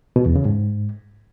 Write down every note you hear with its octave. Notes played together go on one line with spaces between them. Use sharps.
B2
E2
C#3
G#2